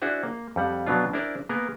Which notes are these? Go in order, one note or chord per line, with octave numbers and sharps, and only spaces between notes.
D4 E4 F#4 G#4 C5
A#3
F2 G3 F#5
B2 F#3 B3 D4 F4
D4 E4 G#4 A#4 C5 D5
A#3 B3 G#4 A#4